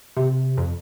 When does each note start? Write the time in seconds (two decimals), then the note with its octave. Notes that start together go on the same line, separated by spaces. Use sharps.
0.17 C3
0.57 F2